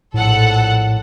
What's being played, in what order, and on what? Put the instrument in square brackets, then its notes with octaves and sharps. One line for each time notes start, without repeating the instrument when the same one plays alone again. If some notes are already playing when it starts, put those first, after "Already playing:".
[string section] A#1 A4 F#5 [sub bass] A2